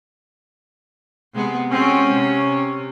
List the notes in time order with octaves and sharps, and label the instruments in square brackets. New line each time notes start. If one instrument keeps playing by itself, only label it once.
[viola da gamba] C3 G#3 B3
[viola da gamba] G#3 C4 F#4 [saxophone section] C#4
[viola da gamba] C3